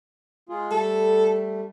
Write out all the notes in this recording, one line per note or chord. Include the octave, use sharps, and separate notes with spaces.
G#3 F4 G#4
G3 A3 A4